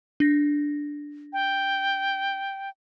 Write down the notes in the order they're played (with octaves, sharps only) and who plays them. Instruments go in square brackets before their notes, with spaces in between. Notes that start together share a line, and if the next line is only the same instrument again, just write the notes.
[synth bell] D4 A#6
[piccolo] G5